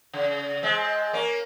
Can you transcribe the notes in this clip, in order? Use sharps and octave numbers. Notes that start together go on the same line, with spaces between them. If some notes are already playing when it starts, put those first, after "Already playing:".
C#3
G#3 C4
A#3 C#4